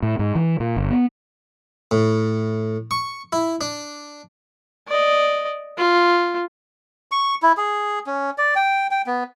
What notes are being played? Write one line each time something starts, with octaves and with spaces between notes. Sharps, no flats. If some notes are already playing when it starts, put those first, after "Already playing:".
A2
G#2
E3
A#2
G1
B3
A2
C#6
E4
D4
D5 D#5
F4
C#6
E4
G#4
C#4
D5
G5
G5
B3